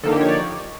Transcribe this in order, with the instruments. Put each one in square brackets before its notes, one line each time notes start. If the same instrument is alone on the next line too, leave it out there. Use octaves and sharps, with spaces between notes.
[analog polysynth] D3 F3 A#3 D#4 A4
G4
C#5
D5